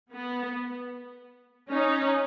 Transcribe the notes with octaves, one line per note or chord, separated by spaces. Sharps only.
B3
C#4 D#4